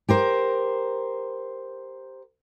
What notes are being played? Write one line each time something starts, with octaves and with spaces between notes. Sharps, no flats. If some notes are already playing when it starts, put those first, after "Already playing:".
G4 A#4 C5